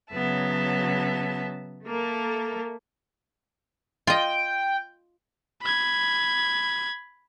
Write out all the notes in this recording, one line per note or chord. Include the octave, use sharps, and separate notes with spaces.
C#3 F#3 B3 E5 A5
A3 A#3 A4 A#4
F4 D#5 G5
B5 G#6